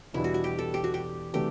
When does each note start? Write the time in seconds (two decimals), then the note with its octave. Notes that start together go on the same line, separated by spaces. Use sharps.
0.13 E2 B2 G3 D4 E4
0.24 F#4
0.34 F#4
0.44 G4
0.59 A4
0.74 G4
0.84 F#4
0.94 G4
1.33 C3 E3 A3 D4 F#4 G4